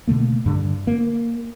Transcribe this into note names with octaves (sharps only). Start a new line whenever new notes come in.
B2 D3 A3 A#3
G2 D3
A#3